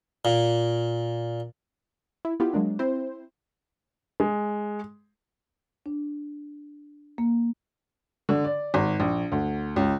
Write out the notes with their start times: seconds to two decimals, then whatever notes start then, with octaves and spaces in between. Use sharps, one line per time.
0.25 A#2
2.25 E4
2.40 B3 E4 F4 G4
2.54 F#3 G#3 A#3 D4
2.79 C4 E4 C5
4.20 G#3
5.86 D4
7.18 A#3
8.29 D3
8.44 D5
8.74 G#1
9.00 A#1
9.32 D2
9.76 C#2